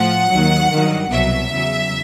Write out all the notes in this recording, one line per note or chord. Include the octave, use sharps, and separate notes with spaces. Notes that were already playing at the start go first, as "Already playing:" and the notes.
Already playing: A2 F3 F#5
D#2 D#3 F#3
G2 D#3 F#3
C2 B2 F#3 E5
E2 C#3 F#3